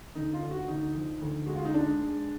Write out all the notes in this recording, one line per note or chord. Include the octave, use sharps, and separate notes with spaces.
D2 D#4
F4
D3
F#4
D2 D#4
F3
D2
G#3 F#4
F4
D#4
G#3 D4
G#3